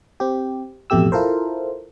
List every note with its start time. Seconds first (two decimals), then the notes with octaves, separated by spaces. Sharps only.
0.20 C4 G4
0.90 A1 F2 B2 A3 G4 E6
1.12 E4 F4 A4 A#4 C5